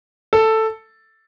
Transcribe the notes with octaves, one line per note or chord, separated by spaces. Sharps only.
A4